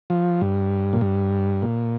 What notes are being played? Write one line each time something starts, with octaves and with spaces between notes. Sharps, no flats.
F3
G2
A#2
G2
A#2